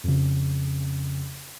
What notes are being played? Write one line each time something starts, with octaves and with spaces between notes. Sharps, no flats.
F2 C#3